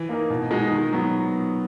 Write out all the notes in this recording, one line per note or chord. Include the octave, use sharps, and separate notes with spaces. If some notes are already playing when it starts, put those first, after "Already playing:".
Already playing: E3
A#3 D#4 A#4
B2
G#3 D#4 F#4
D#3
F#3 B3